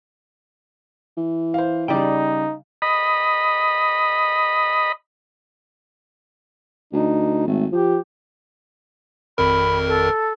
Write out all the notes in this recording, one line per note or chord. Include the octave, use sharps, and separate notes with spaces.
E3
C5 F5
C#3 G3 D#4 D5 G5
D#5 B5
D2 D#4
G#1 A3
F3 G4
G#1 F2 A#4 B5
A4